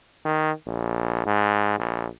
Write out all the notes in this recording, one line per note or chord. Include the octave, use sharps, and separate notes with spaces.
D#3
A#1
G#2
A#1